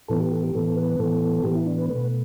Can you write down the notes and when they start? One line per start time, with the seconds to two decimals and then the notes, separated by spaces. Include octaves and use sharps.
0.08 A2 E3 B3 A4
0.20 G4
0.31 A4
0.43 G4
0.54 A2 E3 B3 A4
0.76 B4
0.99 A2 E3 B3 A4
1.44 A2 E3 B3 G4
1.55 E4
1.66 D4
1.78 B4
1.89 B2 A3 B4